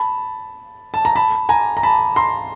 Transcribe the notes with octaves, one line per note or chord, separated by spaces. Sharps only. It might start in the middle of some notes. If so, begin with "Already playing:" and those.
Already playing: A5 B5
A5
A#5
A5 B5
G#5 A#5
A#5
A5 B5
A#5 C6